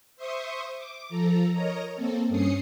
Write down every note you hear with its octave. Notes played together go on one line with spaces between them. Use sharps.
C5 E5 C6 C#6 D#6
D6
F3 A4 A#5
A#4 C#5 D#5 A#5
A#3 C4 A4
G2 C#4 D#6 C7 C#7